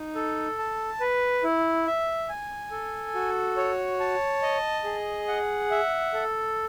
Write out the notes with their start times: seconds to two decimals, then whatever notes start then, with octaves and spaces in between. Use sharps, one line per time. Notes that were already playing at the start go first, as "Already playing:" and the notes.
Already playing: D#4
0.15 A4
0.59 A5
1.00 B4
1.44 E4
1.86 E5
2.29 G#5
2.71 A4
3.15 F#4
3.57 C#5
4.00 A5
4.42 D#5
4.84 G#4
5.28 F#5
5.71 E5
6.14 A4